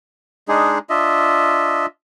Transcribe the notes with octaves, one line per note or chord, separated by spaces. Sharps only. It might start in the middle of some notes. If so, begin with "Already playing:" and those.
G#3 D4 D#4 G#4
D4 F4 D#5 E5